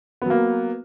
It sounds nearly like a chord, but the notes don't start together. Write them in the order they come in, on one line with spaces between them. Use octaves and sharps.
B3 F#3 A#3